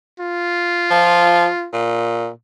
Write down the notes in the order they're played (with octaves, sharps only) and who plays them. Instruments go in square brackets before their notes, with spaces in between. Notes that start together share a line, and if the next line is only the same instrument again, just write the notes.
[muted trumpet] F4
[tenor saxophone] F3
A#2